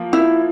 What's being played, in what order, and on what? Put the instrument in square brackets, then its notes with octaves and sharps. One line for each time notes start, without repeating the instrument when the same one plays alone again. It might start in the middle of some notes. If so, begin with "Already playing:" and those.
Already playing: [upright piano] F3 A#3
[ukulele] E4